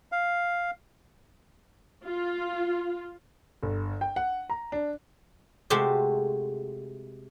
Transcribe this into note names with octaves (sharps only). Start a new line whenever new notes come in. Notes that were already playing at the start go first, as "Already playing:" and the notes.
F5
F4
G1
G5
F#5
A#5
D4
C3 G#3 A3 C4 F#4 G4